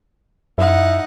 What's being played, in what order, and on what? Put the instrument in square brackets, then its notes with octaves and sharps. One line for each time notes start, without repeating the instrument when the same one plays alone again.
[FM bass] F#2 [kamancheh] D#4 F#5 [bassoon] E4